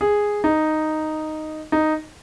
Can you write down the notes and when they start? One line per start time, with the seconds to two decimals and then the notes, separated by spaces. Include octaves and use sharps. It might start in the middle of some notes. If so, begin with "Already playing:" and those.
0.01 G#4
0.44 D#4
1.72 D#4